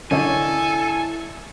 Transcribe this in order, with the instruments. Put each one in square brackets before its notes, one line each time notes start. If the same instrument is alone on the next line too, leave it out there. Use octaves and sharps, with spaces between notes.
[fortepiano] D3 C#5 D#5 [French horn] E4 [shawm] A4 [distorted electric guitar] G#5